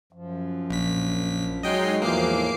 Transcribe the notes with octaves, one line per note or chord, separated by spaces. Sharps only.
F#2 F3
A#1 B6
F#3 G#3 D#4 D#5 G5 C7
E2 A2 E3 F3 A#3 D6 C7 D7